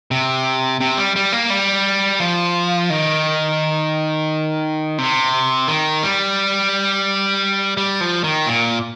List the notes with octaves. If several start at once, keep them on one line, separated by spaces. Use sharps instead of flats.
C3
C3
G3
G3
A#3
G3
F3
D#3
C3
D#3
G3
G3
F3
D#3
A#2